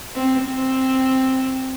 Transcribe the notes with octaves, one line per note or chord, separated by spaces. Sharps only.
C4
C4